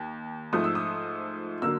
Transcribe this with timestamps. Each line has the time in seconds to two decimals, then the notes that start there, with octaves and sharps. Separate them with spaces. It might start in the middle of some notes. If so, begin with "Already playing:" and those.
Already playing: D#2
0.53 G#2 F3 A3 D#6
0.64 E6
0.75 D#6
1.62 D3 F#3 A#3 E6